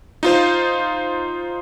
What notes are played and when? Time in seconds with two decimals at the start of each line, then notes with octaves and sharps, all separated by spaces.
0.23 D#4 F4 C5